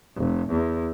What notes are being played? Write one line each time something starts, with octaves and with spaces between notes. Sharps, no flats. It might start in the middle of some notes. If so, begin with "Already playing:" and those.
F1
E2